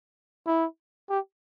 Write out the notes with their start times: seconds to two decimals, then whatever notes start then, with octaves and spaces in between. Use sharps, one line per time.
0.47 E4
1.10 G4